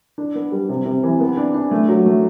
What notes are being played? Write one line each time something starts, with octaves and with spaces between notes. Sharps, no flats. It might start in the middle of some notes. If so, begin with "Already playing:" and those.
D4
B3
G3
C3
C3
E3
B3
D4
D4
A3
F#3
A3